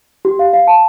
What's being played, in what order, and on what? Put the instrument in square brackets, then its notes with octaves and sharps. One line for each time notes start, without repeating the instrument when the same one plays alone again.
[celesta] G4
F5
F5
A5